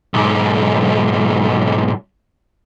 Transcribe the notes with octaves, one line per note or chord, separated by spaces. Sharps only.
B1 G#2